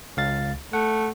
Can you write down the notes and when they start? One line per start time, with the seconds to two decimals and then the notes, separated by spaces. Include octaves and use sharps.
0.17 C#2 F5 A6
0.73 A3 F#5